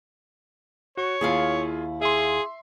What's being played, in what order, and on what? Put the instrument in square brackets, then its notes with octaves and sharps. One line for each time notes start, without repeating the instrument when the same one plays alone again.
[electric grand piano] F#4 [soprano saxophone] C#5
[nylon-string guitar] D#2 E4 F5 [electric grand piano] F4 G#4
[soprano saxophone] G#4 [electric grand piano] E5 C6